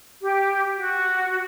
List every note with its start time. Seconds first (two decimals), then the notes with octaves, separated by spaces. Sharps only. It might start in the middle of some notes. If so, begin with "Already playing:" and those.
0.21 G4
0.78 F#4